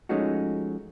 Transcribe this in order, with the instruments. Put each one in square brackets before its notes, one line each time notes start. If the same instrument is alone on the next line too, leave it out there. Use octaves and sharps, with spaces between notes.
[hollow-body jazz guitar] F3 G#3 A3 C#4 D#4 F#4